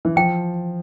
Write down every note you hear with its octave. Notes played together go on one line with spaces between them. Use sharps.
E3
F3 G5